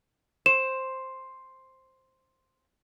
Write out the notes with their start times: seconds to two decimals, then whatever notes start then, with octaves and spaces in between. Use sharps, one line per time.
0.46 C5 E7